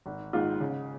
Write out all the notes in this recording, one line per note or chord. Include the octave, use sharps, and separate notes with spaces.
G#1
G#2 D#3 G#3 F4
C#3